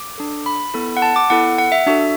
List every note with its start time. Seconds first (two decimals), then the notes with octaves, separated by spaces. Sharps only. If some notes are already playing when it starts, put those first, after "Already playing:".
Already playing: D6
0.18 D4 A4
0.46 B5
0.74 B3 E4 A4
0.97 F#5
1.02 A5
1.16 D6
1.30 B3 E4 A4 F#5
1.58 F#5
1.72 E5
1.87 D4 F#4 A4 E5